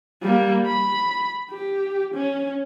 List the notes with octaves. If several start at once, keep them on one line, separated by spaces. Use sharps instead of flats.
G3 A#3
B5
G4
C#4